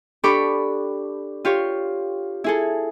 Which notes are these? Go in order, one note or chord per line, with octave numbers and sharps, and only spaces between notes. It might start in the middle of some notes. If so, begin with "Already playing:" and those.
D4 G4 A4 B5 C#6 D6
F4 G4 C#5
E4 G#4 A4